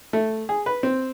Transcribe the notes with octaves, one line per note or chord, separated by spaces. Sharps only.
A3
G#4
B4
C4